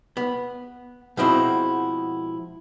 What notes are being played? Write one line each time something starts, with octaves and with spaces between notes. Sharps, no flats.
B3
B2 F3 G#3 C4 E4 F#4